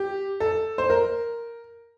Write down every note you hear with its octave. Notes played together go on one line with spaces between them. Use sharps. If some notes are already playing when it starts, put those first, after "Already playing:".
Already playing: G4
A4
C5
A#4